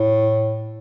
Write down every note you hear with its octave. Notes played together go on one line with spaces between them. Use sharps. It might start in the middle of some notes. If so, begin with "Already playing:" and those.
Already playing: A2